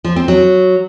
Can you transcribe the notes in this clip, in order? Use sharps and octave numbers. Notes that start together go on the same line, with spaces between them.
F3
C4
F#3